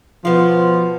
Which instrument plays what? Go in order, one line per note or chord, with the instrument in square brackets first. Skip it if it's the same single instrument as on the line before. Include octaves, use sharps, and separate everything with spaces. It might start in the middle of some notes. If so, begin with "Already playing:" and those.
[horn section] B2 F3 [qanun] B3 F5